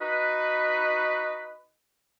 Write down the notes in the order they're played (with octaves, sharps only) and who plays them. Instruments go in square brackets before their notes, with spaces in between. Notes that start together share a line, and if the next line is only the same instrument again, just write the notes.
[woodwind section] D#4 F#4 B4